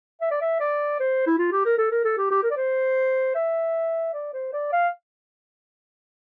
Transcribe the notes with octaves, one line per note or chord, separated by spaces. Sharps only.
E5
D5
E5
D5
C5
E4
F4
G4
A#4
A4
A#4
A4
G4
G4
A#4
D5
C5
E5
D5
C5
D5
F5